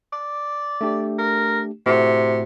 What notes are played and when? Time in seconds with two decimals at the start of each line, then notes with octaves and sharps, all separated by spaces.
0.13 D5
0.81 A3 D4 G4
1.18 A#4
1.86 A2 C3 A3 F#4